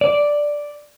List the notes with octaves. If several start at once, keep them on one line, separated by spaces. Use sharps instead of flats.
D5